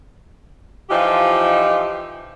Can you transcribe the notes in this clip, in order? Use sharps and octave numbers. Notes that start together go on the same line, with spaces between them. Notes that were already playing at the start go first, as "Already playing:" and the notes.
E3 F3 D#4 F4 G4